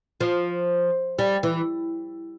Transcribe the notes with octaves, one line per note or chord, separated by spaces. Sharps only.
F3
G3
E3